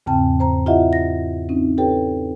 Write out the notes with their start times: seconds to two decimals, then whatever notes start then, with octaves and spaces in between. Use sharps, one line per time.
0.06 E2 G#2 C#3 C4 G5 A5
0.40 C5 A#5
0.66 E4 F4 G4 D#5 E5 F#5
0.93 A#6
1.49 C4 C#4 D#4
1.78 G4 A4 B4 C#5 G5